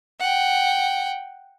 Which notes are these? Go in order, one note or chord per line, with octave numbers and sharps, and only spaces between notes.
F#5 G5